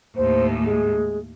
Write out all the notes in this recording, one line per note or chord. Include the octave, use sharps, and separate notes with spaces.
D#2 A2 C5
G#3